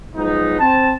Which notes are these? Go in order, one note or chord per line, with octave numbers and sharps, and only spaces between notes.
F3 F#3 G#3 B3 D#4
C4 A5